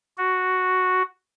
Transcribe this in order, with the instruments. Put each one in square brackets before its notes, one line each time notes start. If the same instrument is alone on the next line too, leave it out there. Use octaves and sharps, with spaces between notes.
[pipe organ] F#4